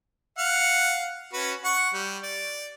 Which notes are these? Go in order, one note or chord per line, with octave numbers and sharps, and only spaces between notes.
F5 F#5 F6
C#4 F#4 B4
F#5 C#6
G3
D5